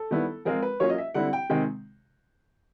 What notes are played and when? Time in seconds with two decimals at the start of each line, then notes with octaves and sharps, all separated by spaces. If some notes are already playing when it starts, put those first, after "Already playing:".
Already playing: A4
0.11 D#3 G3 B3 E4
0.45 F3 G#3 C4 F4 A#4
0.63 B4
0.80 F#3 A#3 C#4 F4 C#5
0.90 D#5
0.98 E5
1.14 D3 G3 C4 E4 F#5
1.33 G5
1.50 C3 D#3 G#3 C4 G5